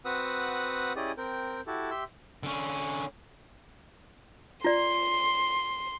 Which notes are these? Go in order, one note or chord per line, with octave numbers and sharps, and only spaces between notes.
C4 F#4 B4 F#5 D#6 E6
C#4 E4 G4 G#4 D5 D#5
C4 A#4 G5
E4 F#4 G4 A4
G4 E5 C6 E6
D3 C#4
F4 D5 C6